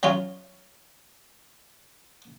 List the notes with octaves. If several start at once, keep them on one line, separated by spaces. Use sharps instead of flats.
F#3 C#4 F4